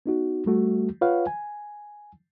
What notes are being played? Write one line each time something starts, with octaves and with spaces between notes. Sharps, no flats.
B3 D#4 F#4
G3 A3 F#4
F4 B4 C#5 F5 F#5
G#5